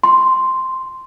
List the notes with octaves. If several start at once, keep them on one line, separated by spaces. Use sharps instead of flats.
C6